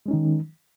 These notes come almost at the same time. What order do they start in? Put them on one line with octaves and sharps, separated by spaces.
G#3 C#4 D#4 D#3